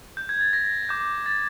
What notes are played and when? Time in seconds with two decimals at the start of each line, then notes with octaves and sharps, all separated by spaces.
0.17 G6
0.29 G#6
0.41 A6
0.53 A#6
0.89 D6 G6
1.26 A6